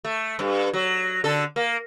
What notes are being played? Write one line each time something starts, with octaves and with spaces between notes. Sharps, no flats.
A3
G2
F#3
D3 A4
A#3